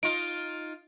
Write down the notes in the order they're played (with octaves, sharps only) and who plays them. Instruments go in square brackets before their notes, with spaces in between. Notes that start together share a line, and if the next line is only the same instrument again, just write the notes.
[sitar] D#4 F4 [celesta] D7